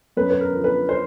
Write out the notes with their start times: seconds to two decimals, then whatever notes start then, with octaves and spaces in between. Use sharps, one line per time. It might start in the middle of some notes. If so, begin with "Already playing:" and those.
0.17 F#2 B4
0.30 B4
0.41 A#4
0.52 D3 F3
0.64 B4
0.89 C5